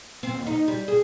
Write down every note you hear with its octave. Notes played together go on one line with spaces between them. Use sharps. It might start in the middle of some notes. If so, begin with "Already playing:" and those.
C4
D#2
D#4
G3
G#4